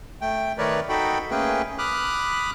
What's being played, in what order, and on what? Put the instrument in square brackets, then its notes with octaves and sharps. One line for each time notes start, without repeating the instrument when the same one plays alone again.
[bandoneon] A3 G5
D#3 A3 A#4 B4 C#5 D5
D#4 F#4 A4 G5 B5
A3 A#3 C#4 G#4 B4 G5
B5 D6 D#6 F6 F#6